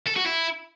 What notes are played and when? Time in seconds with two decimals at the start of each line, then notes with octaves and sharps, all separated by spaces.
0.07 A4
0.16 F#4
0.26 E4